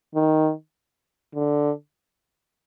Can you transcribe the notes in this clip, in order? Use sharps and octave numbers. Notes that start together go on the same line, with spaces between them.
D#3
D3